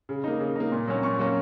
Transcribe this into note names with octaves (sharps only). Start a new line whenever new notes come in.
C#3
A#3 D#4
C#3
A#3 D#4
A#2
F#3 A#3 C#4
A#2 C#6
F#3 A#3 C#4